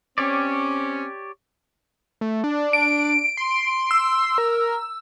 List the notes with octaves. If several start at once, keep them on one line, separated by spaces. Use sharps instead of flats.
C4 C#4 G4 C#5 D5
A3
D4
D7
C6
E6
A#4